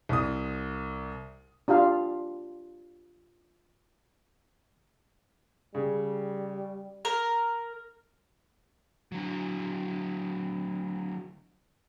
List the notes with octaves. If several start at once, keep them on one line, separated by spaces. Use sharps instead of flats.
C2 D#6
D4 F4 G4 F5
C#3 G3
A#4
D3 F#3